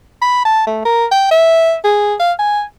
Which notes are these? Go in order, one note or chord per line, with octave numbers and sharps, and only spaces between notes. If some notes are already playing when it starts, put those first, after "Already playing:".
B5
A5
A3
A#4
G5
E5
G#4
F5
G#5